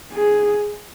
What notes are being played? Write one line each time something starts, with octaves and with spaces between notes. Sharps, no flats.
G#4